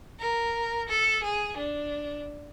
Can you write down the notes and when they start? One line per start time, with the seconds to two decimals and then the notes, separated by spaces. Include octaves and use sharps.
0.20 A#4
0.89 A4
1.24 G#4
1.57 D4